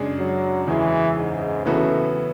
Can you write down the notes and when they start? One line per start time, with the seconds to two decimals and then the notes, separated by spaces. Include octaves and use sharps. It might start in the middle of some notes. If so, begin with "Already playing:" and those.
Already playing: F#2 C#3 G#3 D4 G#4
0.19 F#3
0.68 E2 C#3 E3 G#3 C#4 G#4
1.17 G#2
1.65 A2 C#3 E3 B3 F#4 A4